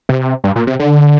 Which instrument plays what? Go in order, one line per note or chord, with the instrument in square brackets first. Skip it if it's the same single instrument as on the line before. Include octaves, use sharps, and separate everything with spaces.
[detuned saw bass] C3
G2
A#2
C3
D3